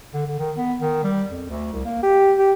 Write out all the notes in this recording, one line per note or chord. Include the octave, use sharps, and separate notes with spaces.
D3
D3
D#3
B3
D#3
G3
F2
D2
C2
A#3
G4
G4